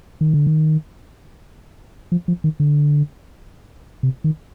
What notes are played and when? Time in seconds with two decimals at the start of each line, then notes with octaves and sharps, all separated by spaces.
0.21 D#3
0.33 D3
0.47 D#3
2.12 F3
2.28 F3
2.44 D#3
2.60 D3
4.03 C3
4.24 D#3